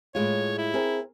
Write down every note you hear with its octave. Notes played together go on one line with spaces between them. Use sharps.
A2 G#3 F4 C#5
E4
C4 G#4 A#4